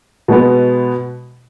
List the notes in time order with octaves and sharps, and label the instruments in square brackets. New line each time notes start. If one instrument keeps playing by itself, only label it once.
[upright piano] B2 G#3 B3